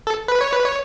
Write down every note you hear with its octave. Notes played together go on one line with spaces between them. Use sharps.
A4
B4
C#5
B4
C#5